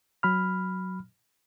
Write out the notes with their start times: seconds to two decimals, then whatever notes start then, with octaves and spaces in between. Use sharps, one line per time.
0.23 F#3 B5 F6